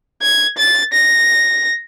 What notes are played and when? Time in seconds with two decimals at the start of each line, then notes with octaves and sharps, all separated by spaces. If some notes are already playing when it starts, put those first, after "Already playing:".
0.22 G#6
0.58 A6
0.93 A#6